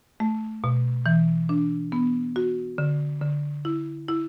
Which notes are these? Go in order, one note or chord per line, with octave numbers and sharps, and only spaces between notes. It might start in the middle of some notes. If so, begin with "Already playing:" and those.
A3
B2
E3
D4
B3
F#4
D3
D3
E4
E4